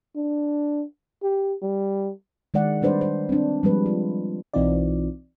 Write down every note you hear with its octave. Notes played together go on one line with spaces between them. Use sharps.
D4
G4
G3
D#3 G#3 D5 F#5
G3 D4 B4 C5 D5
C5
C4 D4
F3 G3 G#3 B4
F4
B1 E3 C4 D#4 F4 D5